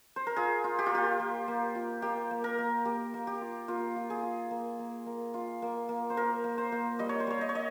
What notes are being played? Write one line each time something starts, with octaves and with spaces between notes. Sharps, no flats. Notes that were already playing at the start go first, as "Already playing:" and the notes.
C5
A#4
F4 G#4
F4
G4
F4
A#3 G4
A#3
A#3
F4
A#3 G4
A#3
A#4
A#3
A#3 G4
A#3
G4
F4
A#3 F4
F4
G#4
F4
A#3
A#3
A#3
F4
A#3
A#3
C5
A#3 A#4
A#3
C5
A#3
G3 D#5
C#5
C5
G3 C#5
D#5
C#5
D#5